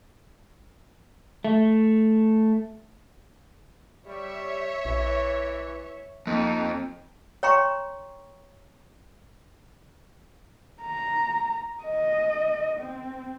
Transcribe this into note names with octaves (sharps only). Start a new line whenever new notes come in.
A3
G3 C#5 E5
A#1 E3
F2 A#3 D#4
C#5 G5 A#5 C6 C#6
A#5
D#5
C4